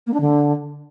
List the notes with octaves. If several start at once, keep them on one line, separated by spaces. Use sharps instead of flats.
A#3
D4
D3